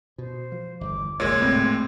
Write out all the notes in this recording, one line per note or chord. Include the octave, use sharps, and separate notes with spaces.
B2 C5
F3
G1 E2 D6
F1 D2 A#2 G#3 C#5 G#6
A2 C4